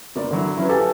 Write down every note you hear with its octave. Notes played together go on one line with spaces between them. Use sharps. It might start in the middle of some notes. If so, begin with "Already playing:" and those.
G1 A#3 D5
D3 F#3 E4
E3 F#3 C#4 E4 B4
G4 A4 B4 F5 G#5 A5